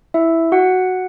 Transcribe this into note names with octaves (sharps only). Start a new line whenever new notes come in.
E4 E5
F#4 F#5